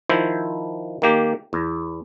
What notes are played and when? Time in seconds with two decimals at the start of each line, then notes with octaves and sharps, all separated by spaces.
0.09 D#3 F3 E4 C5
1.02 D#3 A#3 G4
1.53 E2